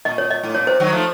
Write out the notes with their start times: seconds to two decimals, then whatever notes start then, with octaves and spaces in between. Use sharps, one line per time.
0.05 A#2 D#5
0.18 C#5
0.30 D#5
0.43 A2
0.55 A#2 C#5
0.67 C3 C5
0.80 D#3 F#3
0.93 F3 A3